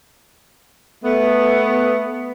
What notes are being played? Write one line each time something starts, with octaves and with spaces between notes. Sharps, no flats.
A3 B3